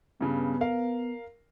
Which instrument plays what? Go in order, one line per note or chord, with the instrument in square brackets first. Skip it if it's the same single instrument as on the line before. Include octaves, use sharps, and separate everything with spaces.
[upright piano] G2 C#3 [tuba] B3
[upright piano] A#4 F5